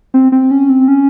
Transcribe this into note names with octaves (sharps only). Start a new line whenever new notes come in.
C4
C4
C#4
C4
C#4